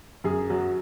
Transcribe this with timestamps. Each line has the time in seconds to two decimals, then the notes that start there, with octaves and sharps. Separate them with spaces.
0.24 F#2 G#4
0.49 F#3 F#4